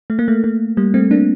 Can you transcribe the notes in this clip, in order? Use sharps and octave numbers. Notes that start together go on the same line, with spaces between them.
A3
A#3
A3
A3
G3 A#3
A3 C4
A#3 D4